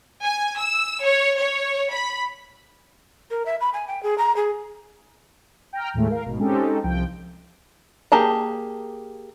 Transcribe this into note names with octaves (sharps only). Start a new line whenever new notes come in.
G#5
E6
C#5
C#5
B5
A#4
E5
B5
G#5
G5
G#4
A#5
G#4
G5 A#5 F6
D#2 A2 G#3 A3
A#4 F5
G#1 B2
G#3 C4 C#4 D#4 G4 A4
C2 F3 G5
A#3 G4 G#4 A5 A#5